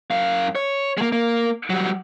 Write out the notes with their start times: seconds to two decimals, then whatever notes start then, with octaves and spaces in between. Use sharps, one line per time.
0.11 F#2 F5
0.56 C#5
0.98 G#3 A#3
1.12 A#3
1.70 F#3 G3